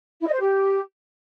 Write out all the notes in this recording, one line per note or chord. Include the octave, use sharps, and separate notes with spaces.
E4
D#5
C5
G4